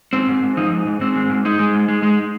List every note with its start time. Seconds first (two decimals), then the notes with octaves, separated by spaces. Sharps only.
0.13 G#2 C4
0.28 G#2
0.43 G#2
0.57 F3 D#4
0.71 G#2
0.87 G#2
1.01 G#2 C4
1.16 G#3
1.29 G#2
1.45 G#3 D#4
1.59 G#3
1.74 G#2
1.88 G#3
2.03 G#3